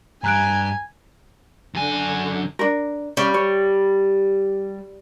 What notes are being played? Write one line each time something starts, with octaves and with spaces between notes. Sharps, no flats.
G2 G#5 A#5 F#6 D7
F#2 D3 G#5
D4 A#4
G3 C#4
C#5